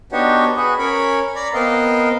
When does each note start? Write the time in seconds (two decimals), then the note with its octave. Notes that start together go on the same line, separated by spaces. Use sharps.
0.12 B3 D4 D#4 F#4 G4 C#5
0.57 F#4 G#4 B4
0.79 C#4 A#4 C#5 B5
1.35 D5 A#5 B5
1.54 B3 C4 A#4 D#5 F5